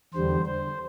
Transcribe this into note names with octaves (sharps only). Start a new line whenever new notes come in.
E2 D3 G3 C5
C5